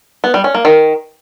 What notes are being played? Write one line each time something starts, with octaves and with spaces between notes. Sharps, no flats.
B3
G3
C#4
A#3
D#3